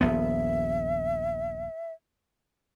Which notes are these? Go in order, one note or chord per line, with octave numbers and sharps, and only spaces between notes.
D#1 A#1 B3 E5